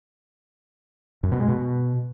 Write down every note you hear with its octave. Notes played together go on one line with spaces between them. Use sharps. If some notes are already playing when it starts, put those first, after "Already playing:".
F#2
B2
G#3
B2